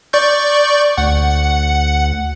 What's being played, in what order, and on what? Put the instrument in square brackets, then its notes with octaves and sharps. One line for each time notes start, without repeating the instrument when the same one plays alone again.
[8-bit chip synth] D5 C#6 G6
[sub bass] D2 [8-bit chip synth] F#5